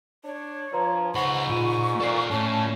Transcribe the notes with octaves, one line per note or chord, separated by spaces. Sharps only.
D4 C#5
F3 B4 A#5 C6
C#2 G#2 C5 F#5 B5 C#6
A#2 F4 D#7
A#2 A4 C5 D5 C7
A2 C#4 A5